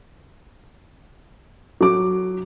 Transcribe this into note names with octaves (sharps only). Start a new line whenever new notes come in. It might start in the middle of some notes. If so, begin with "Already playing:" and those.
F#3 D6